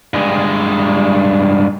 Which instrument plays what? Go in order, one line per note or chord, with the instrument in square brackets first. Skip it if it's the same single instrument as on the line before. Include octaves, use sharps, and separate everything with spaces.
[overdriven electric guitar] G2 G#3